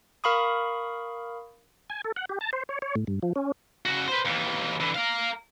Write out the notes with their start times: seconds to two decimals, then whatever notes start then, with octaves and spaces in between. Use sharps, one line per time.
0.24 A#4 F5 B5 C#6 D#6
1.90 G#5
2.04 A4
2.16 F#5
2.29 G4
2.41 A5
2.53 C5
2.69 C#5
2.82 C#5
2.95 A2
3.07 G2
3.23 F3
3.36 C#4
3.85 C#3 F#4
4.08 B4 C5
4.25 D#2 E3
4.80 D3 E3
4.95 A#4 F5